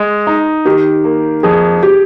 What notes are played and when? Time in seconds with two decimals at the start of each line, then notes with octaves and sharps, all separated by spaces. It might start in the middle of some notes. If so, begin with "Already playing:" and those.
Already playing: G#3
0.27 D#4
0.65 D#3 G4
1.04 A#3
1.43 F2 G#4
1.83 G4